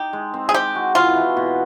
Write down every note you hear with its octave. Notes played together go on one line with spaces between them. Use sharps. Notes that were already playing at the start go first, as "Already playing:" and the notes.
Already playing: D#4 G4
G#3
C4
G#4
G#3 G4
F#4
E3 F4
E3
B2